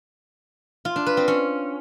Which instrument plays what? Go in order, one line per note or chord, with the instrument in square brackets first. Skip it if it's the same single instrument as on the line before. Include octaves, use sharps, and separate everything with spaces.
[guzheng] F4
D4
B4
C4
C#4